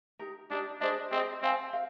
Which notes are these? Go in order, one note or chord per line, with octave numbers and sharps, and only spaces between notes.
D#4 G4 A#4
D4 D#4 G4 A#4
D4 G#4 C5 D#5
C4 G#4 C5 D#5
C4 A#4 F5 G#5
A#4 F5